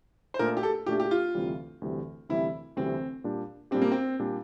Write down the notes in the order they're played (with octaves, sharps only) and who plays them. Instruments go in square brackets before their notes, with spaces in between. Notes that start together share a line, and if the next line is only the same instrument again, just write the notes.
[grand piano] C5
[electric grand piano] A#2 A3 D4 [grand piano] A#4
[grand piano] G4
A4
[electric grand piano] A#2 A3 D4 [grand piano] G4
[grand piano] G4
F4
[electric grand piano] D2 C3 E3 G3
D2 C3 E3 G3
[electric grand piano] D2 C3 E3 G3 [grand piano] E4
[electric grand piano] D2 C3 E3 G3 [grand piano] C4
[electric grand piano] A#2 G3 D4 G4
[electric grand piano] A#2 G3 D4 G4 [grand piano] C4
[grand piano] A#3
C4
[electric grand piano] A#2 G3 D4 G4